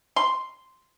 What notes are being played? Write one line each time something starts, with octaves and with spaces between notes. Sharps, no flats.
C6